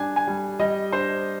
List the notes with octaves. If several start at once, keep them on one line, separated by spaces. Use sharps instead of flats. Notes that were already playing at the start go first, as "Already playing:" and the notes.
Already playing: G3 D4 G#5
G#5
G3
G3 D#5
D4 C5